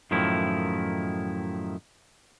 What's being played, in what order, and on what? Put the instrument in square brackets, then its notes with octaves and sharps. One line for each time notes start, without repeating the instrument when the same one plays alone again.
[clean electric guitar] F#2 A2 D#3 F3 E4